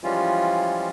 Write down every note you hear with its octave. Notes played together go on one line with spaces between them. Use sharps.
E3 F3 G3 G#3 C#4 F4